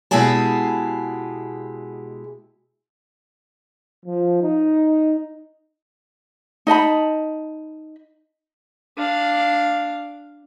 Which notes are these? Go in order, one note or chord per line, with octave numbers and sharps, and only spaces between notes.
B2 G#3 E4 G4 G#4 A5
F3
D#4
D#4 D#5 A5 B5
D4 F5